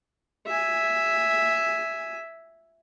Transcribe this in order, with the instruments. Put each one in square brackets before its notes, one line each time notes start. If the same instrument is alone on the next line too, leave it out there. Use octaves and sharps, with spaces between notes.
[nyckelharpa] E5 G#5